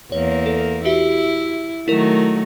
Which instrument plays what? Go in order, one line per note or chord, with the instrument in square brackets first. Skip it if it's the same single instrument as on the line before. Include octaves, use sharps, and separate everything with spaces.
[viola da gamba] E2 A#3 [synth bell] C#5
[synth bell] A4
[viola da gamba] E4 [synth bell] F#4 G4 E5
[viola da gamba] D#3 F#3 A3 [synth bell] E4 A#4